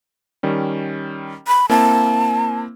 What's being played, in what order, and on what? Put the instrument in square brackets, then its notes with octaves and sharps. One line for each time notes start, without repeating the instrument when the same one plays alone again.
[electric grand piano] D#3 G3 C#4
[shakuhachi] B5
[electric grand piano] A#3 C4 E4 [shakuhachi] A5